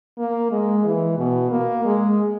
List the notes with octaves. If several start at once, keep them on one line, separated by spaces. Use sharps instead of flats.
A#3
G#3
E3
B2
A#3
G#3